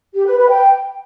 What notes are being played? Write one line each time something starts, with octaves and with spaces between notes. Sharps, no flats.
G4
B4
B4
G5